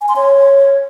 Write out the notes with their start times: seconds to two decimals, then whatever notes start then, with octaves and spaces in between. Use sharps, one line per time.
0.01 G#5
0.09 C6
0.16 C#5